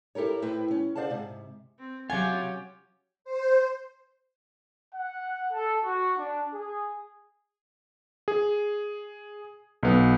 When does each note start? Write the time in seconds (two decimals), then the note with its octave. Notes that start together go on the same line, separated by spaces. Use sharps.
0.15 E4 G4 A4 A#4 C#5
0.42 A2 E4 B4 C5 G5
0.71 C#4
0.96 G#4 C5 D5 F5 F#5 A5
1.10 G#2 C3
1.79 C4
2.10 C3 F#3 C#4 F4 G4 F#5 G#5
3.25 C5
4.94 F#5
5.52 A4
5.84 F#4
6.18 D4
6.53 G#4
8.28 G#4
9.83 B1 B3